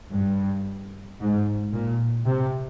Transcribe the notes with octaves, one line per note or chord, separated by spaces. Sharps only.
G2
G#2
A#2
C3